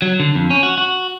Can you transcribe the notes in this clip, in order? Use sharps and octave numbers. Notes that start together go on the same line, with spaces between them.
F#3
D3
F2
C#4
F#4
F#4